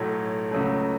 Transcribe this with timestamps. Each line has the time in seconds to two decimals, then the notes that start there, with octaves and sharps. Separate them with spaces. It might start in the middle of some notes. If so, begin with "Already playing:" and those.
Already playing: B1 A2 F#3 A3
0.51 C#2 C#3 F#3 A3